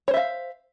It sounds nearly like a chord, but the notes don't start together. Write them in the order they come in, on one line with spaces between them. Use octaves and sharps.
C#5 C5 E5 F5